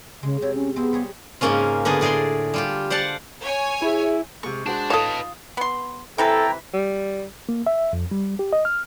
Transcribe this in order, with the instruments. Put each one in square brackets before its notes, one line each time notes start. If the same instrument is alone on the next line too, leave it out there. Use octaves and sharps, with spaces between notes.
[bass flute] C#3 [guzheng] G#3
[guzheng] C3 [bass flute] C#5
[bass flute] C#4
[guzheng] G#3 C4 [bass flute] B3
[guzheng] G3 G#4 C#5
G#2 C#3 A#3 C#4 F4
D3 B3 D4 G#4
A2 G#4 D5 A#5 C6
G3 F4 G4
C5 D5 F5 F#5 A5
[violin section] C#5 G#5
[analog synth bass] E4 [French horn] G#4 [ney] E5
[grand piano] C3 G#3 [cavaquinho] C#6
[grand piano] G#3 F#4 C5 [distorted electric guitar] D4
[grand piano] D#4 [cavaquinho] F4 D#6 [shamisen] A4 C#5 [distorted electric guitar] B4 A5
[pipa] B3 C6
[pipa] C3 E3 B4 [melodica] E4 G5 A#5 [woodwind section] A4
[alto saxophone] G3
[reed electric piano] A#3
E5
F2
G3
G4
D#5
F6